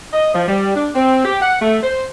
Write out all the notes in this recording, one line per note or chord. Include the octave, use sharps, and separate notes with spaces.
D#5
F3
G3
D4
C4
G4
F#5
A3
C5